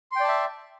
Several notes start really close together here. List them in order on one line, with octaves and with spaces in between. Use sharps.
C6 G5 D5 A5 E5